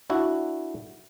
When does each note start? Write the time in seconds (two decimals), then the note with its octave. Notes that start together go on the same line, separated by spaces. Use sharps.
0.10 D4 E4 F#4